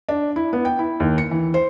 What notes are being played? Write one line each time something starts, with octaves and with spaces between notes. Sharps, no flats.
D4
E4
B3
G5
E4
D#2
C#7
E3
C5